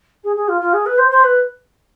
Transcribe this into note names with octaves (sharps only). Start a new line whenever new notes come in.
G#4
G#4
F4
F4
G#4
B4
C5
C5
B4